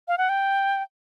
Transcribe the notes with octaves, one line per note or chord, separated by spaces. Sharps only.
F5
F#5
G5